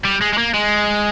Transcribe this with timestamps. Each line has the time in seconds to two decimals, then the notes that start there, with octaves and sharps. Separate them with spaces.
0.05 G3
0.22 G#3
0.33 G#3
0.38 A#3
0.54 G#3